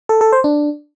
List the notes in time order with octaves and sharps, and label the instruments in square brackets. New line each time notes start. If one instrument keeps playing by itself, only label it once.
[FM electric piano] A4
A4
C5
D4